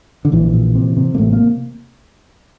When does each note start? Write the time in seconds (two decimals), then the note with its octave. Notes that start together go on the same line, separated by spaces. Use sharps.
0.25 D3
0.32 A#1 E3
0.54 A#2
0.75 C3
0.97 C3
1.15 A#3
1.18 A1 A3
1.33 A#3